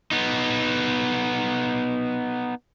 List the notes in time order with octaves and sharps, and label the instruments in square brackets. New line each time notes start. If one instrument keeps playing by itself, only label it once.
[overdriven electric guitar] B3 D#4